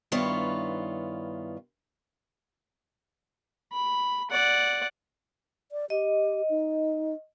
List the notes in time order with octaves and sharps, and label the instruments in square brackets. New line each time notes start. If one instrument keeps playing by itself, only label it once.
[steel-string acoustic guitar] G2 D#3 B3 E4 F4 C#5
[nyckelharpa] B5
D5 F#5
[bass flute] D5
[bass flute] G4 [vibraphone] D#5
[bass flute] D#4